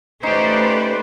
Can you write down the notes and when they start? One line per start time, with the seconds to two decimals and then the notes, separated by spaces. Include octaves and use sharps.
0.23 A3 C#4 D#4 G4 B4 C5 D5